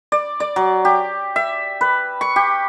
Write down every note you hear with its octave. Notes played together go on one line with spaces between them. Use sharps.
D5
D5
F#3
G4
E5
B4
C#6
G4